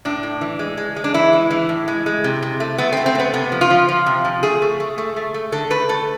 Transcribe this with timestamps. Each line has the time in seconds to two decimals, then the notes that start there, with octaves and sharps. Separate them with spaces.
0.05 A2 D4
0.23 A2
0.41 E3
0.59 G#3
0.77 G#3
0.96 G#3
1.04 D4
1.14 E3 E4
1.33 G#3
1.51 E3
1.69 A2
1.88 G#3
2.06 G#3
2.24 C3
2.42 C3
2.60 A3
2.78 A3 B3
2.93 C4
2.97 A3
3.06 C4
3.15 A3 B3
3.34 C3 B3
3.52 F3
3.61 F4
3.70 F3
3.89 F3
4.06 C3
4.25 F3
4.43 A3 G#4
4.62 A3
4.80 A3
4.98 A3
5.16 A3
5.34 A3
5.52 D3 A4
5.70 A3 B4
5.88 A3 A4